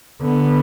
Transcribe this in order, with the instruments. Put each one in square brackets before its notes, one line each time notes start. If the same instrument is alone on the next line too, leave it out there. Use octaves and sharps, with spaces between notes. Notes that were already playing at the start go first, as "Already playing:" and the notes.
[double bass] D3 [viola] B3